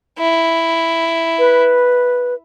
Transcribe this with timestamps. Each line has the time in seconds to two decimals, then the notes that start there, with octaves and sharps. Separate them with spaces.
0.19 E4
1.39 B4